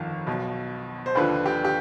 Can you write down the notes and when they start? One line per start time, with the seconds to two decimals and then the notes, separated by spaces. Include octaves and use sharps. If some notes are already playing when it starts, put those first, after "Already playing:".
Already playing: G1 F2 D#3
0.27 B1 B2
1.06 C5
1.15 D#2 D3 F3 B4
1.46 G4
1.65 G4